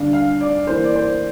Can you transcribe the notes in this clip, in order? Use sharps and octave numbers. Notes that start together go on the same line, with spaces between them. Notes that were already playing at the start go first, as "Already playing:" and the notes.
Already playing: D3 G3 D4 F5
F5
D5
E3 A#3 E4 C5
D5
C5